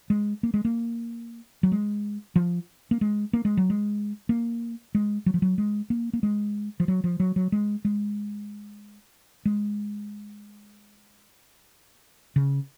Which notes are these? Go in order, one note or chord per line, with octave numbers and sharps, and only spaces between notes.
G#3
A#3
G#3
A#3
F#3
G#3
F3
A#3
G#3
A#3
G#3
F#3
G#3
A#3
G#3
F#3
F3
F#3
G#3
A#3
A#3
G#3
F3
F#3
F3
F#3
F#3
G#3
G#3
G#3
C#3